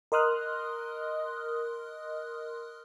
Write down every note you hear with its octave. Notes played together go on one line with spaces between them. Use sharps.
A#4 D#5 C6 D#6 F6 F#6